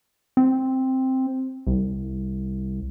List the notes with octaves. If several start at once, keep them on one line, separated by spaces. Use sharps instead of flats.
C4
C2